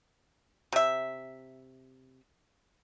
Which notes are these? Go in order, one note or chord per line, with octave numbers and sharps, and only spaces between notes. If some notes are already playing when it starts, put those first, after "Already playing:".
C3 E5